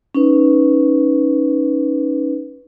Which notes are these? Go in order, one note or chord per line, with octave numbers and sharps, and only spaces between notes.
C#4 D#4 B4